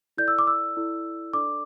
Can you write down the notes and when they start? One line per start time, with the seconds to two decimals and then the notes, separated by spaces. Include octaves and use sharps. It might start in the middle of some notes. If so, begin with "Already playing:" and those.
0.17 E4 A4 D5 G6
0.28 E6
0.39 D6
0.47 E6
0.76 E4 A4 D5
1.33 D4 A4 D5 D6